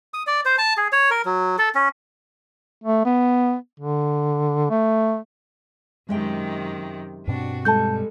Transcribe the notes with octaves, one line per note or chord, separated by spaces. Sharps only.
D#6
D5
C5
A5
G#4
C#5
A#4
F#3
A4
C#4
A3
B3
D3
A3
F#2 C3 D#3 G#3 E5 G5
G2 B2 C4 D4 F#4
G3 G#3 A4 A5 G6